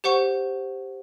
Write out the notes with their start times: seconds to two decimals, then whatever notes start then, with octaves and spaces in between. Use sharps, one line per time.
0.04 G4 C5 F#5 C#6